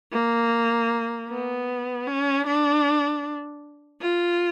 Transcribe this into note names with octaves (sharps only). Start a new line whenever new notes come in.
A#3
B3
C#4
D4
F4